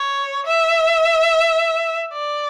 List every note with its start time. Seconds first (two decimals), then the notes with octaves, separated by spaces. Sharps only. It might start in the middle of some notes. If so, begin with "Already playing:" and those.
Already playing: C#5
0.46 E5
2.13 D5